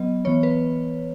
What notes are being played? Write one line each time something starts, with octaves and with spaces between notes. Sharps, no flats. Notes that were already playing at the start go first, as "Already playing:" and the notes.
Already playing: F#3 B3 D#5
E3 B3 C#5
B4